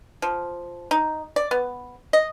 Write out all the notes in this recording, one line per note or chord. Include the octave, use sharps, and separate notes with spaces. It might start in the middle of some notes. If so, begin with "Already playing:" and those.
F3
D#4
D5
B3
D#5